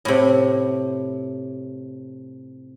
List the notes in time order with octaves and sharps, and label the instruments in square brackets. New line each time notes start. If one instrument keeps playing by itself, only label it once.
[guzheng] A2 C3